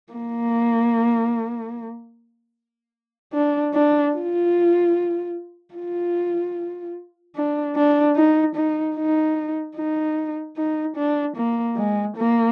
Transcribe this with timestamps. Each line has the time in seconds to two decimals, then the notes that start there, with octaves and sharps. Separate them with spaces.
0.13 A#3
3.33 D4
3.74 D4
4.14 F4
5.74 F4
7.35 D4
7.76 D4
8.16 D#4
8.56 D#4
8.96 D#4
9.76 D#4
10.57 D#4
10.97 D4
11.37 A#3
11.77 G#3
12.17 A#3